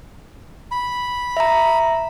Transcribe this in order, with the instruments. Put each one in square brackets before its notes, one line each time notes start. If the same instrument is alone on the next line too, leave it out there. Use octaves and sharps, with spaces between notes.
[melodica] B5
[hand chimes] E5 A#5